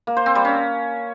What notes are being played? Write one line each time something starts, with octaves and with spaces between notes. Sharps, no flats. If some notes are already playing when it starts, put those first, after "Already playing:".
A#3
C5
C4
G3
C#4